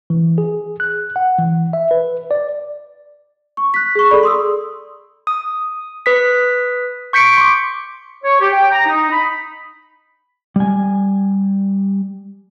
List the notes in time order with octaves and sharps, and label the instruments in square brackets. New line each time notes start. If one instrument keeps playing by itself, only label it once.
[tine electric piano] E3
G#4
F#6
F#5
E3
E5
B4
D5
[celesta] C#6
F#6 B6
G#4 C#6
G#4 A4 D5 B5
C6 D#6 E6
[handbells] D#6
B4 D#6 B6
C#6 G6 B6 C#7 D7
C6 D6
[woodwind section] C#5
G4
G5
A#5
D#4
B5
[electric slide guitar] G3 G#5